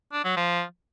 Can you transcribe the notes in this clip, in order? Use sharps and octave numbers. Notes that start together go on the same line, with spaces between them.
D4
F#3
F3